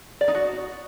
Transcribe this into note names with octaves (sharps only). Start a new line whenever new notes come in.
D5
D#4
F#4